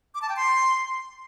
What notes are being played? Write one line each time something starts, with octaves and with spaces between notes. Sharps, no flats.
D6
A5
G5
C6